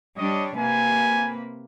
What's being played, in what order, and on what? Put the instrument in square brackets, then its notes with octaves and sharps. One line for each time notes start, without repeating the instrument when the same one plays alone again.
[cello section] G3 D4 C#5 [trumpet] D#5
[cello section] C3 A#3 B4 [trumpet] G#5